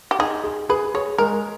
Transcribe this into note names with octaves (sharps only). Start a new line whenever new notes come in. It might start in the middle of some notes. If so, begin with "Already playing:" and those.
G4
D#4 G#4
G#4
G#4 B4
G#4 C#5
G#3 A#4